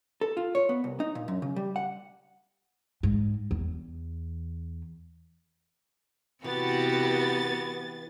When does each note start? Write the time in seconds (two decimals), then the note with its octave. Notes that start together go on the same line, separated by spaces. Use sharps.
0.21 A4
0.37 F4
0.55 C#5
0.69 B3
0.84 C2
1.00 D#4
1.15 A#2
1.28 F#2
1.42 C#3
1.56 G3
1.76 F#5
3.03 G#2
3.51 E2
6.44 C3 E3 B3 F#4 G4 A6